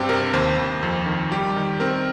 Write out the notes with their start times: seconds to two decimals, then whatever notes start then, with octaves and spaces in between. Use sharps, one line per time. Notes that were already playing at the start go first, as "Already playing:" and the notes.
Already playing: G2 C4 G4
0.09 C3 A#4
0.34 D#2 C5
0.58 D#2
0.83 F2
1.06 D#3
1.31 G3 G4
1.56 D#3
1.80 C4 A#4